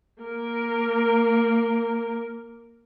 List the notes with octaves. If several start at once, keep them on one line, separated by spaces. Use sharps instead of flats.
A#3 A#4